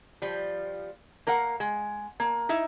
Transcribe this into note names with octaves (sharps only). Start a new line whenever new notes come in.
F3 G3
A#3 A#4 F5 F#5
G#3
A#3
D#4 E4 E5